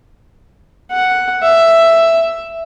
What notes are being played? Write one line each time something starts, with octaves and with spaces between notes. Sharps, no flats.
F#5
E5